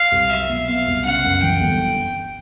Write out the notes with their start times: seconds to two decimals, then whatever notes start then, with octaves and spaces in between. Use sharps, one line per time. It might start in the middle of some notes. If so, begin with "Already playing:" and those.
Already playing: F5
0.12 C2
0.31 F#3 E5
0.50 B2
0.68 B3 F5
0.87 C2
1.05 C#3 F#5
1.24 F#2
1.43 E3 G5
1.61 G1